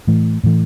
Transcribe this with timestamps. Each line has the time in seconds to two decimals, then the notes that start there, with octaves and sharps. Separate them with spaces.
0.07 A2 E3 A3
0.44 A2 E3 A3